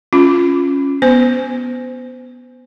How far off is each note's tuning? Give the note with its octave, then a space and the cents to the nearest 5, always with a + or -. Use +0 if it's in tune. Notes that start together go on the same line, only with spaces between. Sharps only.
C#4 +0 F4 +0
B3 +0 C5 -30